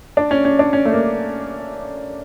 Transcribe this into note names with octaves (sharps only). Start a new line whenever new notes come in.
D4
C#4
C#4
D4
C#4
A3
A#3